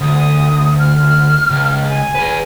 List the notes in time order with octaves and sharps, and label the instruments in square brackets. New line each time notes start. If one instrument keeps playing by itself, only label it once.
[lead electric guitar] D2 [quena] D#6
[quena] F6
[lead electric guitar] C#2
[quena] G#5
[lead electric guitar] G#4 B4